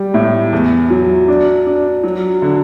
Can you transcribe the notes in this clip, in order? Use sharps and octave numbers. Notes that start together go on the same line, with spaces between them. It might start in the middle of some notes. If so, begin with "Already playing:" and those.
Already playing: G3
A2
E2
F#3
D4
D4
F#3
D3